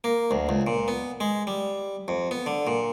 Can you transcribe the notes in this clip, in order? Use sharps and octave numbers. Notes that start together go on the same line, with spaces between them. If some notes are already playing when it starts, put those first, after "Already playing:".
A#3
D2
C#2
A#2
B3
G#3
G3
F2
B3
D3
A#2